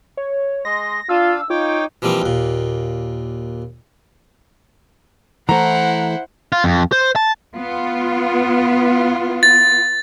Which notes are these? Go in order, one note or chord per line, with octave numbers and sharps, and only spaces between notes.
C#5
G#3 D#5 C6 A#6
D4 F4 F5 E6
D#4 F4 C#5 G5 D6
E3 F3 G3 A#3 C4
D#2 A#2
E3 A3 E4 C5 F#5 A#5
F4
F2
C5
A5
B3 F4
A6